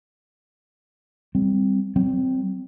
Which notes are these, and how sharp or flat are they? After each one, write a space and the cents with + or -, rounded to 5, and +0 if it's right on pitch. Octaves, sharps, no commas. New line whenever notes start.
G3 +10 C4 +0
G3 -40 C4 -5